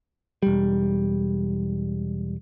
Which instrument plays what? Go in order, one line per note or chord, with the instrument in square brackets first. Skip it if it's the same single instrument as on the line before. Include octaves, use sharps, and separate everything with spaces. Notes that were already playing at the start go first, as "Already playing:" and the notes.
[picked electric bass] E1 G3